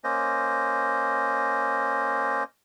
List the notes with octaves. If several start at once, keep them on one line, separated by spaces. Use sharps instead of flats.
A#3 C#4 C5 D#5